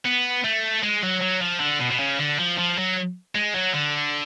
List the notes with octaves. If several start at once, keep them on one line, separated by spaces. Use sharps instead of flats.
B3
A3
G#3
F#3
F#3
F3
D3
B2
B2
C#3
D3
F3
F3
F#3
G#3
F#3
D3